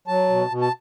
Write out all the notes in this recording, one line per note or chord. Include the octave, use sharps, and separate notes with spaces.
F#3 A5
B2
B2
A5